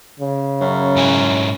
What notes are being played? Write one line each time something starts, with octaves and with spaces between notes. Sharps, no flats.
C#3
F#2
G#2 E4 G#5